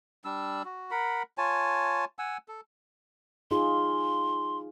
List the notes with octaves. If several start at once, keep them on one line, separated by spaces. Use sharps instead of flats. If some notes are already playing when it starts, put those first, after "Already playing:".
G3 D4 E6
F#4
A#4 F#5 B5
F4 C#5 G#5 A5
F#5 G#5 E6
A4
D#4 F4 G#4 C6